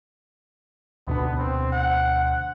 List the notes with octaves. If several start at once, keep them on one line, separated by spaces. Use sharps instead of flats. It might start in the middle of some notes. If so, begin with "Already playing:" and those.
D2 B2 B3 D4
C4
F#5